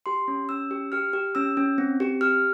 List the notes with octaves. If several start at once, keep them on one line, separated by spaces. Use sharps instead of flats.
G4 C6
C#4
C#4 E6
G4
G4 F6
G4
C#4 E6
C#4
C4
G4
G4 F6